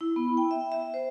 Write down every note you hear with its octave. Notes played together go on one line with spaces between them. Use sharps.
E4
B3
G5
E5
E5
C5